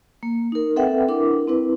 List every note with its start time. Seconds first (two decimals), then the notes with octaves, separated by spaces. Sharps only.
0.23 A#3
0.52 D#4 A#4
0.76 C4 A4 B4 E5 F#5 G5
1.08 D4 E4 A#4 D6
1.47 C4 E4 B4